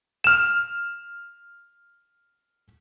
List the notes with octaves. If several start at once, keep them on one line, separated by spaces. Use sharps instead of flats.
F6 E7